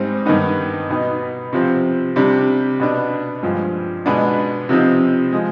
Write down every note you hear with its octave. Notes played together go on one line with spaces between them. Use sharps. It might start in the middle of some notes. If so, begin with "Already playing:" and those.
Already playing: G#2 G3 C4 D#4
G2 D#3 B3 D#4
B2 B3 D#4
C3 F3 C4
C3 G3 D4
B2 B3 D4
G2 F3 G#3
B2 G#3 B3 D4
C3 F3 C4 D#4
F3 G#3